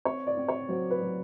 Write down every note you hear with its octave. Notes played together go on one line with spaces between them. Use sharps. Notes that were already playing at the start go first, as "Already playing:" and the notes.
C4 C#5
D5
C4
C#5
F#3 C5
B4
F#3